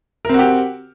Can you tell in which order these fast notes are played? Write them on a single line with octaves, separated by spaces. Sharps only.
A#4 C4 F#4 G4